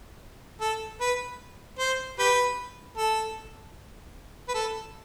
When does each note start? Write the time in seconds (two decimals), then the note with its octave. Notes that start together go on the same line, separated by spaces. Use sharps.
0.61 A4
1.00 B4
1.79 C5
2.19 G4 B4
2.97 A4
4.48 B4
4.54 A4